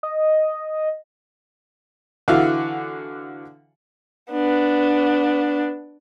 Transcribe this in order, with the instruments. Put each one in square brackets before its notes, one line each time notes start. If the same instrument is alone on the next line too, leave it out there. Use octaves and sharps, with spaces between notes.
[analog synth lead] D#5
[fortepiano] D3 E3 F#4 E5 F5
[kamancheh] B3 D4